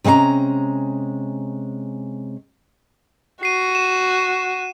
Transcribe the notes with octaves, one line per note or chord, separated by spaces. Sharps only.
C3 G#3 C#4 F5 A#5
F#4 C7 D#7
E7